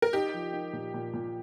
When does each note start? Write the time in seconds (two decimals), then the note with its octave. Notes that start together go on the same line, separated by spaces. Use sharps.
0.02 A#4
0.13 D#4 G4
0.34 F3
0.53 D#4
0.73 A#2
0.94 A#2
1.13 A#2